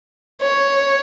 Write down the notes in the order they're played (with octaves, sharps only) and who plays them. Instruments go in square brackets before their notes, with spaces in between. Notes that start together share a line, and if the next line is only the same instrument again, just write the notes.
[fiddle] C#5